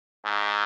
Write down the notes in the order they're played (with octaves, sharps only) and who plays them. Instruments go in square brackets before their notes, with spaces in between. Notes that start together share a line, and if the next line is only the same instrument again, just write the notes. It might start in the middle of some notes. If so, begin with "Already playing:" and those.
[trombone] G#2